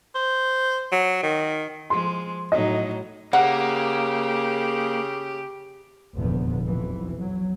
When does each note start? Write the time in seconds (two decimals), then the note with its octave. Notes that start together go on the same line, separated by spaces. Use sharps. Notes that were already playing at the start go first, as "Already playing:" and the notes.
0.15 C5
0.92 F#3
1.23 D#3
1.90 F3 G#3 C6
2.52 A2 F#3 D#4 D#5
3.33 C#3 A#3 G4 F#5
6.15 F1 A#1 E2 G2 D3 B3
6.64 B1 F2 E3
7.18 F#3